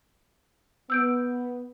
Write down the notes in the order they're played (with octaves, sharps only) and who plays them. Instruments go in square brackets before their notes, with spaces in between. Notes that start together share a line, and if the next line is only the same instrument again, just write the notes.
[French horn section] B3 [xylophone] E6 G6 D7